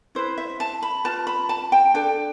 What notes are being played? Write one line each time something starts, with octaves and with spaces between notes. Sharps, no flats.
E4 B4 C5
E5
A5
B5
F4 B4 A5
B5
A5
G5
D4 A4 G5